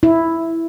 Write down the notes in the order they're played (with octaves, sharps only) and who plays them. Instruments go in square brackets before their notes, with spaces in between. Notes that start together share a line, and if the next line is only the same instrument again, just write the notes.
[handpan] E4